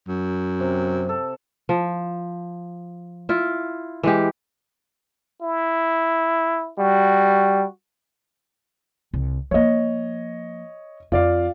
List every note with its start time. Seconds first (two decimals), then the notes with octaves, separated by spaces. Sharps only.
0.08 F#2
0.60 C3
1.09 A4
1.69 F3
3.29 E4 F4
4.03 E3 G#3 G4
5.42 E4
6.78 G3 F#4
9.14 C2
9.51 F3 A#3 C#5 D#5
11.12 F2 F4 D5 F5